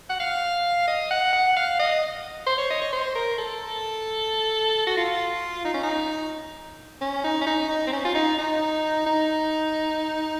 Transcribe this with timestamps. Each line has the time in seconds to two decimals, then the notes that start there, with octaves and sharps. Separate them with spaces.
0.09 F#5
0.20 F5
0.87 D#5
1.10 F#5
1.33 F#5
1.56 F5
1.79 D#5
2.46 C5
2.57 C#5
2.70 D#5
2.82 C#5
2.92 C5
3.15 A#4
3.38 A4
4.87 F#4
4.97 F4
5.64 D#4
5.74 C#4
5.83 D#4
7.01 C#4
7.24 D#4
7.41 C#4
7.46 D#4
7.69 D#4
7.87 C4
7.92 C#4
8.05 F4
8.14 D#4
8.38 D#4
9.06 D#4